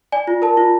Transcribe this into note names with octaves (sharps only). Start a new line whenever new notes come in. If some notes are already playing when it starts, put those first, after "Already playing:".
D5 G#5
F4
A#4 A5
F4